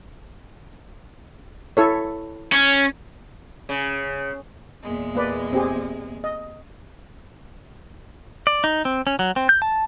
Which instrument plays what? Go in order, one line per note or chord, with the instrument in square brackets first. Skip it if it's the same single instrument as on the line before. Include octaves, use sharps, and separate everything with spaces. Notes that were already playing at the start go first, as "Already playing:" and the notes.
[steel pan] E4 A4 C#5
[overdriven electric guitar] C#4
[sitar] C#3
[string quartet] E2 A#2 G#3
[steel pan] A#3 B4 D5
C4 G4 G#4
D#5
[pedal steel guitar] D5
D#4
C4
C#4
F#3
C4
G6
A5